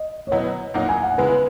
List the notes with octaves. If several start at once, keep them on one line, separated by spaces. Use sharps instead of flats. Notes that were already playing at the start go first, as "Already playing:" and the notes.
Already playing: D#5
C#5
B2 F#3 B3 E4 D#5
A#2 F#3 A#3 D#4 F#5
G#5
F#5
C#3 G#3 B3 E4 B4